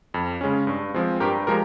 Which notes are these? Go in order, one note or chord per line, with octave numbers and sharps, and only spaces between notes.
F2
C#3 G#3 C#4
G2
F3 G#3 C4
G2 G4 A#4
F3 G#3 G4 A#4